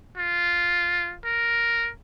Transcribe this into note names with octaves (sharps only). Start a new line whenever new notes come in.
F4
A#4